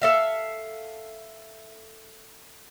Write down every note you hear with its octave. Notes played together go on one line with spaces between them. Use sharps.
A4 E5 F5